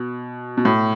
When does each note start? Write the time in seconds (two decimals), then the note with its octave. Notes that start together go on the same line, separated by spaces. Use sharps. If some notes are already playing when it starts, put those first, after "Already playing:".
Already playing: B2
0.57 B2
0.65 A2